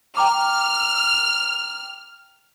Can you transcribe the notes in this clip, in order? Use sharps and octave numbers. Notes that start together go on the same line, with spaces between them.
G5 A#5 D6 F6